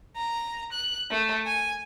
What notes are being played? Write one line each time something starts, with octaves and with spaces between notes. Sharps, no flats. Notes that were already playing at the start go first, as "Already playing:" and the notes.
A#5
F#6
A3
G#5